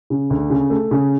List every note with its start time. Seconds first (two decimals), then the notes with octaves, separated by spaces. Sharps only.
0.10 C#3
0.30 D2
0.50 C#3
0.70 A3
0.91 C#3